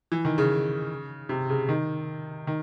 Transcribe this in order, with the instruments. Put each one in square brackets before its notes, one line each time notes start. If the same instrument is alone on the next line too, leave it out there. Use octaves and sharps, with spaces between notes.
[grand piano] E3
D#3
C#3
C3
C#3
D#3
D#3